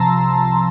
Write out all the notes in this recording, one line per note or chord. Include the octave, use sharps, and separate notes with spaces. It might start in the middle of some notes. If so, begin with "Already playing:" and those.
Already playing: C2 C3 F3 A5 A#5 C6 E6